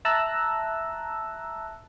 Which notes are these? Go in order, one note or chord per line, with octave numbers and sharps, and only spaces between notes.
E5 A5 A#5 E6 F#6